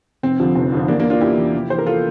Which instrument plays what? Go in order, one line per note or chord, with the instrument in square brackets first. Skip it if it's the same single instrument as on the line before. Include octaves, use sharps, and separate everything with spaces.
[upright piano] F1 C4
F2 D3 F3
F1
F2 D3 F3
E2 A#3 D4
E3 A#3 D4
D4 F4
E2 E4 G4
E3
F1
E2 E3 C5
A#4
F4 A4